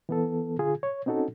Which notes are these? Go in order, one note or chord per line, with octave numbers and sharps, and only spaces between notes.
E3 B3 A4
D3 F4 G#4
C#5
C4 C#4 D#4 F#4 A4